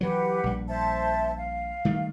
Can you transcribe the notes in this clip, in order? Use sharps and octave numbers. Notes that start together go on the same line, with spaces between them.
E3 F#3 G4 B4 F#5
A#1 G3
C5 E5 A5
F5
D#3 G3 A3